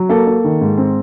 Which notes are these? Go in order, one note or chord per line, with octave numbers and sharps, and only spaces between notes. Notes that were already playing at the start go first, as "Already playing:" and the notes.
Already playing: F#3
A#3 A4
A#3
D#3
G#2
C4